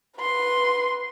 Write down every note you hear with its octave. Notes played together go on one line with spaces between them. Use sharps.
B4 C6